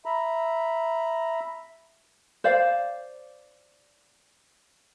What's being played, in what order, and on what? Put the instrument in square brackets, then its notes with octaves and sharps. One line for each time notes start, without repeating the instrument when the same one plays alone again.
[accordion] E5 A#5 B5
[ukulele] C5 D5 F5